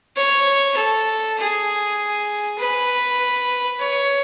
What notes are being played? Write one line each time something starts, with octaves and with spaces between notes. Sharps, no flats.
C#5
A4
G#4
B4
C#5